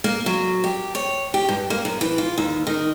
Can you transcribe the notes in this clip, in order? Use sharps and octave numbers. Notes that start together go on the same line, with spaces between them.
A#3
F#3
G4
C#5
G4
G2
A#3
F#2
E3
F4
D#2
D#3